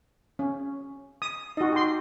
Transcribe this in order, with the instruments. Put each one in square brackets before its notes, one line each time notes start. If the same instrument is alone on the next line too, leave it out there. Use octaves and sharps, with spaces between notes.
[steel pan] C#4
D#6
[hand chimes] D#4 [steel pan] F#4 D#5
[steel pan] G4 C6